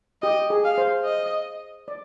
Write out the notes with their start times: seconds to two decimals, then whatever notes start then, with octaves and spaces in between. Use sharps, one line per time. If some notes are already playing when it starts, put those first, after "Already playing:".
0.23 G4 D#5
0.50 G#4
0.65 F5
0.78 C5
1.05 D#5
1.88 D5